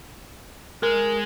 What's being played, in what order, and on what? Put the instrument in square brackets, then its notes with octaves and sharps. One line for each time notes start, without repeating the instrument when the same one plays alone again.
[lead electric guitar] G#3 [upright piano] A#4